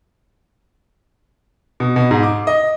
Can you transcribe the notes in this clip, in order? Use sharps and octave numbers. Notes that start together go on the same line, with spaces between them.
B2
B2
G#2
D6
D#5